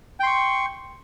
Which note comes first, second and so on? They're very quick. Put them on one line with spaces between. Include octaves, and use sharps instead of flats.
G5 C6 C#6